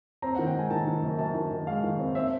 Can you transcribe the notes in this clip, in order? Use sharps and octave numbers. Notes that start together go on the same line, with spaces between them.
C4 A#5
D#3 F#5
G5
G#3 G#5
D#3 A5
D#3
F#2
F#2 A5
D#3
D#3
G#3 F5
D#3
C4
C4 E5